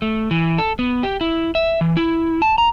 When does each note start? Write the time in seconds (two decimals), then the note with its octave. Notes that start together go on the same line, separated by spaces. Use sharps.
0.02 A3
0.31 E3
0.58 A4
0.79 B3
1.03 G4
1.21 E4
1.55 E5
1.81 E3
1.97 E4
2.42 A5
2.58 A#5